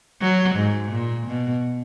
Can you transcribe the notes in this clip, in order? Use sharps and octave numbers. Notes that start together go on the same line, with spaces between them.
F#3
G#2
A#2
B2